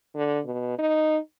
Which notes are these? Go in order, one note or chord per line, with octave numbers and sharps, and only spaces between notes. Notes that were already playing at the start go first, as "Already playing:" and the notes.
D3
B2
D#4